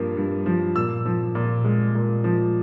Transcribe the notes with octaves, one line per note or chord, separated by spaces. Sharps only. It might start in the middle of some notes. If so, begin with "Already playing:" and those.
Already playing: G2 F3 A#3
G2
F3
A#2 E6
F3
A#2
G#3
A#2
F3